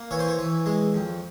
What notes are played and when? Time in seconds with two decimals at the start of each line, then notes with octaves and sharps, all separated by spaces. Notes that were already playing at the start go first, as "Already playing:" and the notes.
Already playing: A#3
0.11 E3 C#5
0.19 C5
0.28 C#5
0.39 E3
0.66 G#3
0.94 F2